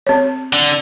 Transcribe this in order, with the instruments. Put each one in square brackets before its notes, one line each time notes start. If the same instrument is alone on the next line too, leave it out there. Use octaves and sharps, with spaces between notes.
[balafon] C4 C#5
[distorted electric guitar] D3